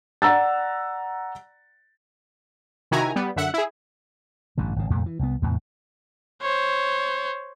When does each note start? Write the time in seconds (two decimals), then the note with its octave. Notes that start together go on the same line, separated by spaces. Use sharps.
0.22 D5 F#5 A#5 E6 A6
2.91 C3 D#3 E4 F#4 G#5 A#5
3.16 G3 B3
3.36 F#2 D3 E5 F#5
3.54 E4 G#4
4.58 A1 G2 D3
4.76 G#1 C#3
4.90 C2 F2 A#2 A3
5.06 E3
5.19 C2 B3
5.42 E2 A2 C3
6.42 C5 C#5